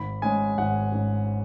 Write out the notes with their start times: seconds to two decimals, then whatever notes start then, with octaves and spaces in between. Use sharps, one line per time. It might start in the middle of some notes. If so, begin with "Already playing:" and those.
Already playing: G#1 B5
0.22 G#2 G#3 C#4 G#5
0.58 G#1 F#5
0.92 G#2 G#3 C#4